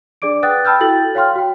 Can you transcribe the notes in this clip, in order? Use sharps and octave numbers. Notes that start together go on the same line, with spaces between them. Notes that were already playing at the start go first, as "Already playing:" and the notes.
D4 G#4 D5 D6 D7
B4 F#5 G5 D#6 F#6 A6
G5 A5 B5 E6 F6 G6
E4 F#4 A4 G5 A6 F#7
C#5 F5 G5 C6 F6
F#4 G5